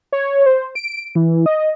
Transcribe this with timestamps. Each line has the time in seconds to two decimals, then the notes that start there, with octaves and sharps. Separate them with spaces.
0.12 C#5
0.46 C5
0.75 D7
1.15 E3
1.46 D#5